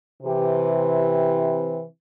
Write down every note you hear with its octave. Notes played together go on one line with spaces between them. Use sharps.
C3 E3 G4